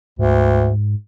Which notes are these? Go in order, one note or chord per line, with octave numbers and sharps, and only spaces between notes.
D2 G#2